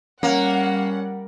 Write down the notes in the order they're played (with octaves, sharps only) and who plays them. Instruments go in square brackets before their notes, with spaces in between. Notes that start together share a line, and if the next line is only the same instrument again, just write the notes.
[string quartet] G3 [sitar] A#3 [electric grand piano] C#4 [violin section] F#5